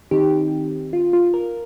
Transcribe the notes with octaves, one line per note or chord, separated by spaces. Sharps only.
D#3 C4 D#4 G4
F4
F4
A#4